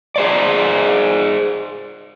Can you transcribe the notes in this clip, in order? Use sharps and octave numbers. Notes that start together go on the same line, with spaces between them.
G#4 C5 D5